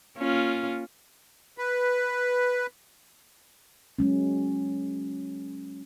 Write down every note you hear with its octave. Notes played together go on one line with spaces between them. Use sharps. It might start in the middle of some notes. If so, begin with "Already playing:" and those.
A#3 C#4 F4
B4
F#3 G#3 C#4